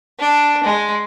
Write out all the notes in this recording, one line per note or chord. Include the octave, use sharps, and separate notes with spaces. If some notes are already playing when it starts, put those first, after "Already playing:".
D4
G#3